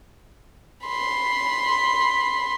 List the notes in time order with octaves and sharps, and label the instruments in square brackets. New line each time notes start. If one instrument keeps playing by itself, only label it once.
[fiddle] B5 C6